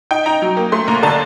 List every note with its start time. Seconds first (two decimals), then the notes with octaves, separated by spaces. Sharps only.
0.11 D#4 G5
0.26 D#4 A#5
0.42 F#3
0.57 A#3
0.72 A3 C6
0.88 D#2 A#5
1.03 D3 A5